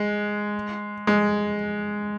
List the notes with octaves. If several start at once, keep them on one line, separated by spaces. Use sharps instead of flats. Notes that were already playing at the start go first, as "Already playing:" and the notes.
Already playing: G#3
G#3